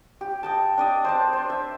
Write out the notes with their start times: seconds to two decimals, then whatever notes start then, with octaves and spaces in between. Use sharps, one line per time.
0.21 G4
0.43 D#5 G5 A5
0.78 D4 D5 D#5
1.05 C5 D5 A5
1.33 C5
1.50 E5